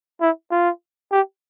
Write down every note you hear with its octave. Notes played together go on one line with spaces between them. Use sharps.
E4
F4
G4